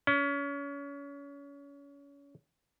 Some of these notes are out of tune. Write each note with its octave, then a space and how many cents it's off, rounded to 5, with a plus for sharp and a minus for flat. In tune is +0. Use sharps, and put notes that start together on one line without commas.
C#4 +30